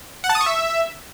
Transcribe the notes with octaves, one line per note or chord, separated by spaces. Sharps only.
F#5
A5
D#6
C#6
E5